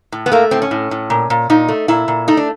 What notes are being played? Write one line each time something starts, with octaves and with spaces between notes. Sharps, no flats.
A2
B3
A3 A#3
A2 C4
C#4
A2
A2
A#2
A#2
A#2 D#4
A3
A#2 E4
A#2
A3 D#4
D4